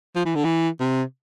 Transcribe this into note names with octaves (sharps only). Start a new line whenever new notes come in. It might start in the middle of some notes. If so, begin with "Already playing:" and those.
F3
E3
D3
E3
C3